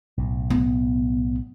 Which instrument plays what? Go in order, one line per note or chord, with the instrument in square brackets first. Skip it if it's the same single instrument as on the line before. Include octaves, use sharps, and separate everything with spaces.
[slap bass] B1 A2
[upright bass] B3